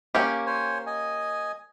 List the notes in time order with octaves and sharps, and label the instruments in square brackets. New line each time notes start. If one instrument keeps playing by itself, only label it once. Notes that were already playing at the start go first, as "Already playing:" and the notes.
[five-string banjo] A#3 C#4 G4
[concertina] C5 C#5 G#5
D#5 G#5